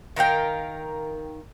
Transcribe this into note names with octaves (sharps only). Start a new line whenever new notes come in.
D#3 A#4 F5 G5